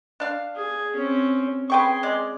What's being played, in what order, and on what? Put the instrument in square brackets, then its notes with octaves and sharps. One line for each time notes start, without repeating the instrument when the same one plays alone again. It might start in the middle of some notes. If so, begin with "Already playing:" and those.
[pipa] D4 F5
[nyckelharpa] G#4
C4 C#4
[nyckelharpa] G#4 C6 [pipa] B4 G5 C#6
[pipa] G#3 D5